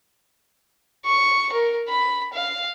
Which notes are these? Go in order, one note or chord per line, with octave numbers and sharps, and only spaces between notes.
C#6
A#4
B5
F5